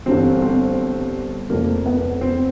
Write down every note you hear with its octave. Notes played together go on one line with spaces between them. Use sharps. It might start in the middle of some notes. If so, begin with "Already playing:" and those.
G1 G2 E3 C4
C4
F1 F2 C#3 A#3
B3
C4